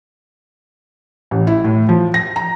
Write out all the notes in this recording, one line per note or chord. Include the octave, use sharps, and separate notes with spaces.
A1
E4
A2
F3
A#6
A#5